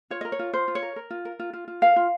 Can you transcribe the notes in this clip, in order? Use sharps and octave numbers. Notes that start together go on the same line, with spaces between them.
F4 C#5
A#4 D#5
C#5
F4
F4 C5
F4
C#5
A#4
A#4
F4
A#4
F4
F4
F4
A#4 F5
F4